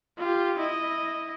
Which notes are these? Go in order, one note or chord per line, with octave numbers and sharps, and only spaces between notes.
F4 G4
E4 D#5